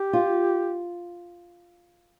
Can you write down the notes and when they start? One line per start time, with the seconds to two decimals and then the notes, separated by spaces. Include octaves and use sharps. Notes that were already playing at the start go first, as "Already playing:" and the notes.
Already playing: G4
0.13 F4